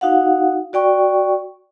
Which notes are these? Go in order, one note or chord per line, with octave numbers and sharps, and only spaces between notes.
D#4 F#4 F5 F#5
F#4 D5 G5 C#6